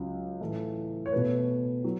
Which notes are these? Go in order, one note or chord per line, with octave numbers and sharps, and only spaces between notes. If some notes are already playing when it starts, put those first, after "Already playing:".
Already playing: C#2 C#3 F#3
A2 E3 A3
C#5
B2 A3 B4
F#3